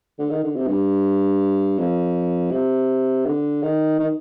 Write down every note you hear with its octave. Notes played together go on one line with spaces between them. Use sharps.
D3
D#3
D3
C3
G2
F2
C3
D3
D#3
D#3